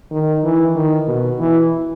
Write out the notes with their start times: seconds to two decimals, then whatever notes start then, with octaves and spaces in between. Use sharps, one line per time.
0.11 D#3
0.44 E3
0.76 D#3
1.08 B2
1.40 E3